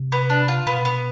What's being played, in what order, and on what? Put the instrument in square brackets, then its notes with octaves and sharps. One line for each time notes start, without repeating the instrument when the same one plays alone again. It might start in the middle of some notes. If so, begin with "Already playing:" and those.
Already playing: [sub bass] C3
[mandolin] B3
D4
F4
[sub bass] B2 [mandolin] B3
[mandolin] B3